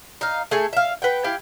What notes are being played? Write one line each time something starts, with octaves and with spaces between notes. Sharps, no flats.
D#4 F5
A3 G#4 A4
E5 F5
B4 F#5 G5
E4 G4 F5